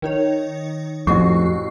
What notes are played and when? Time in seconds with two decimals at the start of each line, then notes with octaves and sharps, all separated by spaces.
0.02 D#3 D#4 C#5
1.07 A1 F2 F#4 C#6 C7